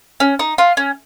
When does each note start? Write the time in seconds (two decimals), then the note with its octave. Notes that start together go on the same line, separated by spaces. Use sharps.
0.20 C#4
0.39 D#4
0.58 F4
0.77 C#4